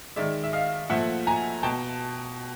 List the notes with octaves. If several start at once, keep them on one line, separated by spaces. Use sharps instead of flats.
D#3 G#3 D5 E5
E5
D#5 F5
A#2 F3 A3 E5 F#5
G#5 A#5
B2 G5 A5